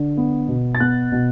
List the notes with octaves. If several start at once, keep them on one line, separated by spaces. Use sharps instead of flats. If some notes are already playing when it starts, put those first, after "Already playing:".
Already playing: D3
B3
B2
A6
B3 F#6
B2